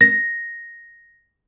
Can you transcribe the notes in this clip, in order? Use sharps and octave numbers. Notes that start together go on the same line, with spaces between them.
A#6